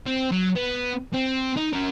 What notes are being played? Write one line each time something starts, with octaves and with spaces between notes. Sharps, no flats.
C4
F#3
B3
C4
D#4
C#4 A#4